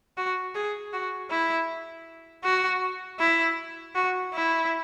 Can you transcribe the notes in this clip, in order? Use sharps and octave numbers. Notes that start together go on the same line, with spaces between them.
F#4
G#4
F#4
E4
F#4
E4
F#4
E4